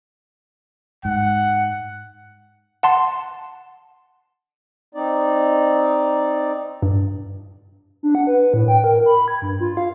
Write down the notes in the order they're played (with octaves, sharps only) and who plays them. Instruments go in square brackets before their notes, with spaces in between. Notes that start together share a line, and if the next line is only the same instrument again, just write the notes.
[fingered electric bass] G#2 [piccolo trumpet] F#5
[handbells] F#5 A5 C6
[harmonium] C4 D#4 D5
[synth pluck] G2
[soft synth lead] D4
F#5
B4
A2
G5
A#4
B5
G#6
G2
F4
F5